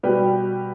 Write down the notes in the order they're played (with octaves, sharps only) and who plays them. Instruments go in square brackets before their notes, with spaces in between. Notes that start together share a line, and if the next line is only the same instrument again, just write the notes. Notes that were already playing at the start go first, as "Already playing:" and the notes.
[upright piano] B2 G3 G4 B4